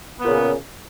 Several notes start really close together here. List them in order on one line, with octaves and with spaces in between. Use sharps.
B3 A#2 C#3